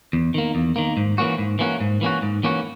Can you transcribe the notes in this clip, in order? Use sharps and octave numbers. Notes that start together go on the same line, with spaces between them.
E2
D#3 A#3
E2
D#3 A#3
G#2
E3 A#3 C#4 F#4
G#2
E3 A#3 C#4 F#4
G#2
E3 A#3 C#4 F#4
G#2
E3 A#3 C#4 F#4